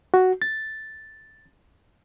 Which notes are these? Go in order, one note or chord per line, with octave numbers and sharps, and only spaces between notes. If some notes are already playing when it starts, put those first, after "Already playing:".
F#4
A6